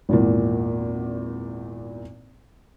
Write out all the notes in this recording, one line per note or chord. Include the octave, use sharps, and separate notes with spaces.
G#1 E2 A#2